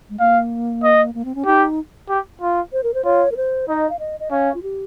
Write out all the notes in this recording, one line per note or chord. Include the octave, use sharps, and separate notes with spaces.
G#3
A#3 F5
D#5
A#3
C4
C#4
D#4 G4
G4
F4
C5
A#4
C5
F4 C#5
A#4
C5
D#4 D#5
F5
D#5
D#5
C#4 F5
F4
G4